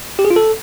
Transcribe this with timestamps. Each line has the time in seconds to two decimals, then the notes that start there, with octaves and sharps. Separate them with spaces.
0.19 G4
0.25 G#4
0.30 F4
0.36 A4